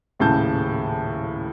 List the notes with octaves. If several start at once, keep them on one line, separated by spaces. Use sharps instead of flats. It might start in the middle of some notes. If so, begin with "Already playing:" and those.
D#1 A2 C#3 A5 G6